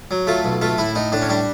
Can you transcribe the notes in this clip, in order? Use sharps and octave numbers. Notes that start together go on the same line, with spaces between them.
F#3
A3 F4
B1
A3 F4
A2 E4
A2 D#4
A2 D4
C#4
G3 D4